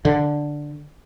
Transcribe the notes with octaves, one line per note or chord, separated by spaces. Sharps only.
D3